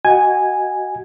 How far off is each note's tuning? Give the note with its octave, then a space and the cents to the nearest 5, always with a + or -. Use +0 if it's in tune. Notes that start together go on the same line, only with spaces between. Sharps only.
F#4 +15 D#5 +0 G#5 -5